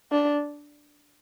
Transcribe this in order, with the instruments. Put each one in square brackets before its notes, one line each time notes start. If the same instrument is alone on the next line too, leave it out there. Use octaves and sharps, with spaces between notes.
[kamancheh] D4